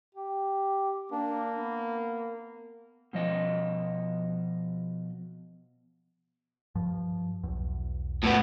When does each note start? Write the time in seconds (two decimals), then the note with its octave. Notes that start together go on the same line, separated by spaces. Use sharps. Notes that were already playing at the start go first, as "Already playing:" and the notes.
0.15 G4
1.12 A#3 D4
1.57 B3
3.13 B2 F3 D#5
6.75 G2 F3
7.43 B1 E2
8.23 A2 B3